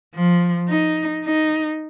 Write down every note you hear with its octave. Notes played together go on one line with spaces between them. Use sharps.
F3
D#4
D#4